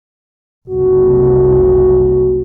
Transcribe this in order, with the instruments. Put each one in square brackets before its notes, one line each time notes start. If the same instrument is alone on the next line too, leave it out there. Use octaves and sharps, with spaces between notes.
[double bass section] F#1 C2 [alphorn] F#4